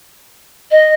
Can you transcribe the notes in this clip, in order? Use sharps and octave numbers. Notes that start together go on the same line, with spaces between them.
D#5